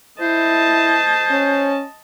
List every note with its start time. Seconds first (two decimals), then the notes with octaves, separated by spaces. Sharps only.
0.21 E4 C5 D#5 A5
1.31 C#4